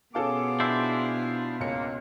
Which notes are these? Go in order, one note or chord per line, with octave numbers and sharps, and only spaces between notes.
B2 B3 C#4 F4 G#4 A4 F5 D6
D4 E4 C5 E6
C#2 A#3 C#4 C#7